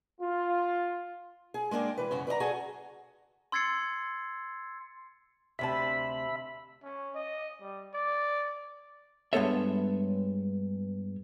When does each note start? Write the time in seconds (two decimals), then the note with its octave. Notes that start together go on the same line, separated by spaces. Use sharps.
0.21 F4
1.54 G#4
1.71 G#3 A#3 D4 G#4 G5
1.97 E3 B4
2.11 F#2 C#3 F#4
2.27 B4 D5 D#5 A#5
2.40 F#4 G#4 A4 D5 G#5
3.52 C6 E6 G#6 A6 C7 C#7
5.59 D2 C3 E5 A5 B5
6.84 C#4
7.15 D#5
7.61 G3
7.93 D5
9.33 G2 G#3 B3 A4 C#5 E5